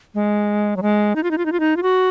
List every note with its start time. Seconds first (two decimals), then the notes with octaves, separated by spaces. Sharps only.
0.15 G#3
0.77 F#3
0.82 G#3
1.16 D#4
1.23 F4
1.31 D#4
1.38 F4
1.46 D#4
1.52 F4
1.60 D#4
1.77 F4
1.83 F#4